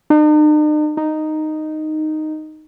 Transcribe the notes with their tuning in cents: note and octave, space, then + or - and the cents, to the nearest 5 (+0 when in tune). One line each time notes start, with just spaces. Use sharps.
D#4 -45
D#4 -5